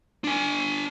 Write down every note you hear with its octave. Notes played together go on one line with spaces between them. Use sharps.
D4 G#5